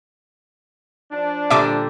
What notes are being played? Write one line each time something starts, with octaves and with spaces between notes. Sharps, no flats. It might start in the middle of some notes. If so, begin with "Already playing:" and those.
F3 D4
A#2 D3 G3 E5 D6